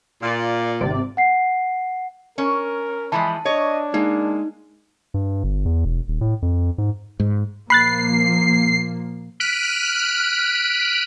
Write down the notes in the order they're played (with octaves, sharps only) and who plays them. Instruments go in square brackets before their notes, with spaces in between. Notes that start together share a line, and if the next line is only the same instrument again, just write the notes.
[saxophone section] A#2 [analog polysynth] F4 D5
[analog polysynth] G#1 C3 D5
[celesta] F#5 C7
[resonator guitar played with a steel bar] C#4 [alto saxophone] A#4
[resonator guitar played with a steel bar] E3 F3 G#3 [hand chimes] A5 [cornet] B5
[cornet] D4 [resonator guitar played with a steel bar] C#5 [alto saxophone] D#5
[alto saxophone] G#3 [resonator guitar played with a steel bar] A#3 [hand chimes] D#4
[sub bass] G2
G1
E2
E1
D#1
A2
F2
G#2
[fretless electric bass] G#2
[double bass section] A#2 F3 A#3 [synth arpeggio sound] B5 F#6 A6 [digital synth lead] C7
[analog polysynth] F6 F#6 B6 D7 D#7